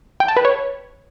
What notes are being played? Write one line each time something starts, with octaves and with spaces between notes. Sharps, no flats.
G5
A5
B4
C#5